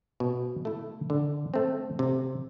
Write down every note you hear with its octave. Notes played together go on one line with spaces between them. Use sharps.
B2
A3 E4
D3
A3 C4
C3